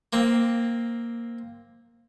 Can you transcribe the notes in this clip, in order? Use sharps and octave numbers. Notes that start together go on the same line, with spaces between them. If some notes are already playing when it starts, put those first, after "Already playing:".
A#3 C4